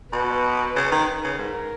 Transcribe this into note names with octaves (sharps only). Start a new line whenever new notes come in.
B2 B4
C#3
D#3
C#3
G#2 A#4